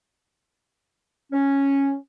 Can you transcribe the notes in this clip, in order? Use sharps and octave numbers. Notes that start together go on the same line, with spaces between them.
C#4